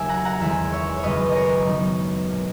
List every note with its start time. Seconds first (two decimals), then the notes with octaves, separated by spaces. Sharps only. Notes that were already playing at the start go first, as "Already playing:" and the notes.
Already playing: D#2 C#3 F#3 A#3 E5 G#5
0.09 F#5 A#5
0.25 F#5 A#5
0.40 E2 D#3 G#3 E5 G#5
0.72 C#5 E5
0.97 C#5
1.03 F#2 C#3 G#3 B4 D#5
1.30 D#5
1.36 A#4 C#5
1.65 F#2 D#3 F#3 B3 D#4
2.30 B2 A#3